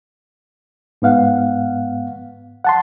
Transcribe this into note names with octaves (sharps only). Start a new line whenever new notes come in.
G#2 B3 F5 F#5
F#5 A5 C6